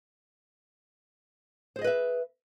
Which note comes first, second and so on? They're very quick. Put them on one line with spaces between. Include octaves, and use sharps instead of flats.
C5 G#4 D#5 B4 E5